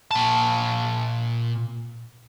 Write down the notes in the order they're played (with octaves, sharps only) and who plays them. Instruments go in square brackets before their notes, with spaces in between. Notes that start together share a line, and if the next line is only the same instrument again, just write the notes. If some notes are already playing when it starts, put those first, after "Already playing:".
[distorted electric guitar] A#2 A5